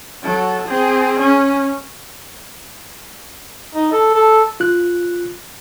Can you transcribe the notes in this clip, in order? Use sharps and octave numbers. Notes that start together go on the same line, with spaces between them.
F#3 A4
C4 G#4
C#4
D#4
A4
A4
F4 F#6